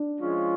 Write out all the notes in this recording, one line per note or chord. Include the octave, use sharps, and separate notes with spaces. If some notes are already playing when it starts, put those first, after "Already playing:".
Already playing: D4
F3 G#3 C#4 F4